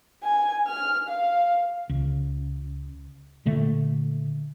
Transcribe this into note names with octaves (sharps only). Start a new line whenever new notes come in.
G#5
F6
F5
C#2
A#2 D3 A3